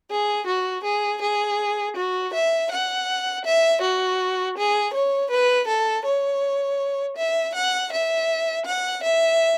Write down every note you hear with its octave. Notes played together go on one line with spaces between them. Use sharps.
G#4
F#4
G#4
G#4
F#4
E5
F#5
E5
F#4
G#4
C#5
B4
A4
C#5
E5
F#5
E5
F#5
E5